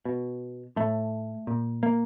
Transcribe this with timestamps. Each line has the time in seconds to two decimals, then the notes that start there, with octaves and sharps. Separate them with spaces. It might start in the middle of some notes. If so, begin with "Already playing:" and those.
0.05 B2
0.76 A2 A3
1.47 A#2
1.83 A#3